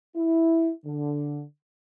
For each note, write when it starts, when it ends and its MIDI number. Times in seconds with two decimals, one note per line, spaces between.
0.15 0.71 64
0.85 1.42 50